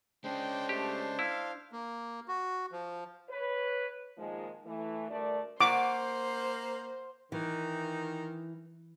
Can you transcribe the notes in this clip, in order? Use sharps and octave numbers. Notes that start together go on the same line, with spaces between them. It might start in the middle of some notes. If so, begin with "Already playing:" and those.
G#3 C#4 D4 C5 G5
A3 G4
E4 F5
A#3
F#4
F3
B4 C#5
A#2 D#3 F3 G#3
E3 A3
D2 G2 A3 A#4 D5
A#3 C5 F#5 C#6 D6
D#3 E3